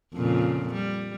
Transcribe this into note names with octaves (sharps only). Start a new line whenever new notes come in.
F2 A#2 C#3
G3